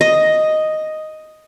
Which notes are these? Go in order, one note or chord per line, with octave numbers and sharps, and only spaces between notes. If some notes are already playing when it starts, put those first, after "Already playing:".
D#5